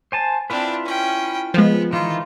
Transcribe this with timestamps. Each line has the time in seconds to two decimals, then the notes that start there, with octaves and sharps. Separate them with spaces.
0.12 C5 G#5 A5
0.50 C4 D4 E4 F4 B4
0.85 C#4 G5
1.54 F3 G#3 B3
1.93 D#3 E3 D#4 F4